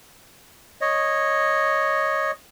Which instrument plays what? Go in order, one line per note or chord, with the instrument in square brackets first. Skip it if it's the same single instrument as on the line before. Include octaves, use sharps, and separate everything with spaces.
[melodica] C#5 D#5